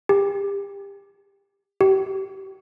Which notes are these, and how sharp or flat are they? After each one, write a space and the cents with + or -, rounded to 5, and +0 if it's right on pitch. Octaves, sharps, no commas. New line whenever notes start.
G4 +30
G4 -35